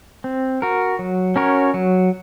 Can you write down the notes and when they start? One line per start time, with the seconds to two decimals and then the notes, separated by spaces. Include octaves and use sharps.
0.24 C4
0.62 F#4 A#4
0.99 F#3
1.36 C#4 F#4 A#4 C#5
1.74 F#3